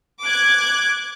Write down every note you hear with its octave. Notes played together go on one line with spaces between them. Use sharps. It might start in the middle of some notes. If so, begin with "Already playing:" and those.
D6 F#6 G#6